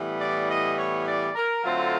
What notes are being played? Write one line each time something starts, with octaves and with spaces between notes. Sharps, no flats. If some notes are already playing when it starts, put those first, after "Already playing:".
Already playing: A2 E3 G3 B3
D5
D#5
C#5
D5
A#4
D3 F#3 A3 C4 F4